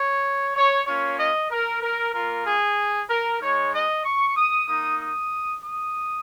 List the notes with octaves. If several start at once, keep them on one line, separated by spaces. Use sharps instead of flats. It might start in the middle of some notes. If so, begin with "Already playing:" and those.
Already playing: C#5
C#5
A#3 C#4 F4 C#5
D#5
A#4
A#4
A#3 F4 A#4
G#4
A#4
G#3 D#4 C#5
D#5
C#6
D#6
A#3 D#4 D#6
D#6
D#6